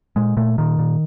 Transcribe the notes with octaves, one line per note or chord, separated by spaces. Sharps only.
A#2 G#3
A#2 A3
A#2 D#3
A#2